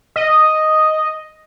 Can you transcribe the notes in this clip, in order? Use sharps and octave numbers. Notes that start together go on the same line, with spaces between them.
D#5